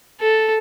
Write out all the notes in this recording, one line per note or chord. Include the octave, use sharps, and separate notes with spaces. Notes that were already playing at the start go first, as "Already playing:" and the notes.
A4